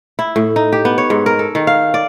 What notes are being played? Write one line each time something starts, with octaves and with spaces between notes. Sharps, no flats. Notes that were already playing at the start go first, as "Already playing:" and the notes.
E4
A2
D#4
G4
B3
C#5
G#2
A#4
A4
D#3
F5
D5